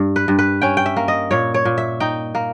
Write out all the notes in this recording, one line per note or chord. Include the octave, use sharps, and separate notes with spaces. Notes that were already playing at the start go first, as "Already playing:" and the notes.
Already playing: G2
B4
G2
B4
C#4 G5
G5
E5
A#3
D#5
A#2 C#5
C#5
A#2
E5
D#4 G5
A#3